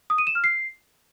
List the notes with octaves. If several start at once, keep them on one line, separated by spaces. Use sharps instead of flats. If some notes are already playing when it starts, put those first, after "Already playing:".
D#6
D#7
E7
F6
C7